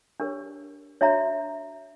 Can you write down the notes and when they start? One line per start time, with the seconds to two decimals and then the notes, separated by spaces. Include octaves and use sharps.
0.20 D4 G4 A#4 C#5
1.01 D4 F#4 C#5 E5 A#5